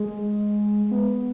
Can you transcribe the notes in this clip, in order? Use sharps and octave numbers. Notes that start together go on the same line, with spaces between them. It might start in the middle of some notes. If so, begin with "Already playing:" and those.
Already playing: G#3
B3